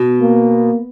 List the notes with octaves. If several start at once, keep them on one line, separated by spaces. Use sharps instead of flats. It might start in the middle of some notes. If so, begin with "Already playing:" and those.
Already playing: B2
A#3